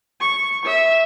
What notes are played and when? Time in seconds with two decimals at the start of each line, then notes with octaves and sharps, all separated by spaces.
0.21 C#6
0.65 E5